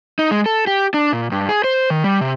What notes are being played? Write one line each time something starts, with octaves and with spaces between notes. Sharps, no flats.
D#4
G#3
A4
G4
D4
A#2
G2
G#4
C5
D#3
G3
C3